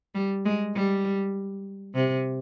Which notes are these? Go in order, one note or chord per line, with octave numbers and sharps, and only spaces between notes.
G3
G#3
G3
C3